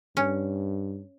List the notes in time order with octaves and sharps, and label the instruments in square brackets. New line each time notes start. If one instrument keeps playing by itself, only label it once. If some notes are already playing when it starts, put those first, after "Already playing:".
[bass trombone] G2 [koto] C#4